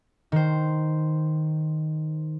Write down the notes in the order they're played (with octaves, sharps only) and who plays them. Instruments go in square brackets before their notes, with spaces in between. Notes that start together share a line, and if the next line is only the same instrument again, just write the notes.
[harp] D#3 C5